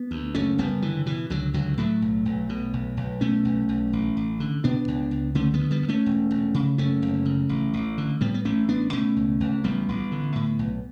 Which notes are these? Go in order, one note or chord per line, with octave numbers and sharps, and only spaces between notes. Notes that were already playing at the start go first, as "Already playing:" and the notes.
Already playing: B3
D2
F#1 A3 C#4
F#1 G3 B3
D3 E3
B2 E3
C#2 D3 F#3
C#2 D3 F#3
A2 F#3 A3
B1
B1
B2
B1
B1
B2 A3 C#4
B1
B1
A1
A1
D3
B2 B3 D4
C#2
C#2
D3 A3 C#4
G3 B3
D2
G3 B3
D2
A3 C#4
E1
E1
C#3
F#1 A3 C#4
F#1
C#3
A1
A1
D3
A2 G3 B3
B3
A1 A3 C#4
A1 B3 D4
B2 A3 C#4
C#2
C#2
A1 G3 B3
A1
D3
A2
B1